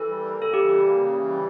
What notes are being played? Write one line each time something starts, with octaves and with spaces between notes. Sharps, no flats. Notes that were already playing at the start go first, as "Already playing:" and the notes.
Already playing: E3 A4
G3
A#3
C#3 A4
E3 G4
G3
A#3
C#3
E3
G3